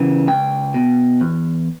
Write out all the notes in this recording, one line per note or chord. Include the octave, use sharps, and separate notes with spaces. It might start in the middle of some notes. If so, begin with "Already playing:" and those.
Already playing: C#3 E3 F#5
C#2 G5
B2
E2